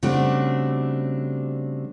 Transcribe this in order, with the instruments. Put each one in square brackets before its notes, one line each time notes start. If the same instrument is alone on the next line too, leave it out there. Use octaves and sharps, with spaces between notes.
[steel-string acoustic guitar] C#3 G3 A3 C4 D4 F#4